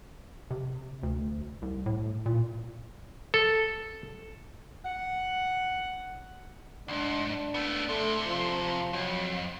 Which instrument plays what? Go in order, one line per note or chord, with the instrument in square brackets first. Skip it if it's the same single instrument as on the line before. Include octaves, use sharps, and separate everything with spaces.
[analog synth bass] C3
D2
C2
A2
A#2
[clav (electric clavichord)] A4
[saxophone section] F#5
[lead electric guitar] D2 G#2 [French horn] D4
[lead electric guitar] A3 B3
[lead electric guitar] C2 C3 [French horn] A3
[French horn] F3
[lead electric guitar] F2 [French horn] F#3